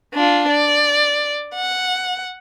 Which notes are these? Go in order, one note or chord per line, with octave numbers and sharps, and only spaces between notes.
D4 F4
D5
F#5